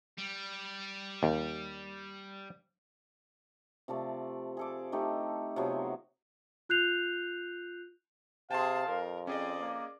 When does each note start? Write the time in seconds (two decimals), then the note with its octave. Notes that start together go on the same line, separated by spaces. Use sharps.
0.18 G3
1.23 D#2
3.88 C3 F3 A3 D5
4.57 G#4 A4 D6
4.92 A3 D#4 G4
5.56 C3 F3 F#3 B3
6.69 F4 F#6 G6 C7 F7
8.51 C3 G#4 F5 G5 A5 C6
8.87 F2 A#4
9.27 C4 C#4 G#4 D5 D#5
9.60 A#3